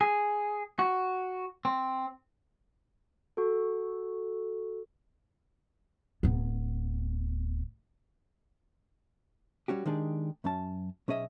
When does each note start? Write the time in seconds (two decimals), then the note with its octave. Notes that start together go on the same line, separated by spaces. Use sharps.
0.01 G#4
0.79 F#4
1.65 C4
3.37 F#4 A4
6.23 D1 B3
9.68 G3 C#4 F#4 G4
9.86 D#3 G#3 D4 G4 G#4
10.44 F#2 F#3 C#4 A5
11.08 B1 C#4 G#4 D#5 E5